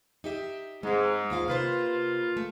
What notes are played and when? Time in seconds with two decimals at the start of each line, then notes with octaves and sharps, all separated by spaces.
0.24 D#4 G4 E5
0.83 G#2 G#3 C4
1.30 D#2 F4 F5
1.48 C3 A#3 F4 B4 C5
2.37 A3